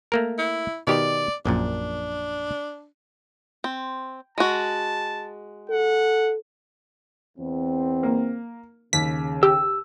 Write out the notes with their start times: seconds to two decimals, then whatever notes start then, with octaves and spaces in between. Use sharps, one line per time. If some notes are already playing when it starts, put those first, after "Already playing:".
0.12 A3 A#3 A#4
0.38 E4
0.87 B2 D#3 G4 D5
1.46 A#1 F#2 A#2 D4
3.64 C4
4.38 G#3 F#4 A5
5.70 A4 F#5
7.38 E2 C4
8.03 A#3
8.93 D#2 C#3 B6
9.43 G4 E6